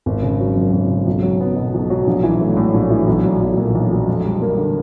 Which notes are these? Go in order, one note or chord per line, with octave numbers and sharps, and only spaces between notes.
G#1
C#3
F#3
F#2
G#1
C#3
B1
F#3
B3
B2
B1
F#3
A#1
E3
A3
A2
A#1
E3
B1
F#3
B1
A#2
B1
F#3
F2
G3
A#3
D3